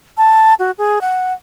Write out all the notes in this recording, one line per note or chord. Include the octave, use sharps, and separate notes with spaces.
A5
F#4
G#4
F#5